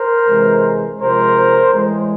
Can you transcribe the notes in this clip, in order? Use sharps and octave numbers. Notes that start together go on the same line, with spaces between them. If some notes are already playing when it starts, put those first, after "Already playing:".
Already playing: A#4 C5
C3 E3 G#3
C3 F3 G#3 A#4 C5
A2 E3 G#3